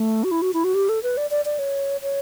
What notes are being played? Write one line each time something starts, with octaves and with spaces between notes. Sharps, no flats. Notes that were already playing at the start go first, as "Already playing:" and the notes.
Already playing: A3
F#4
E4
F#4
E4
F#4
G4
A4
B4
D5
D5
D5
C#5
C#5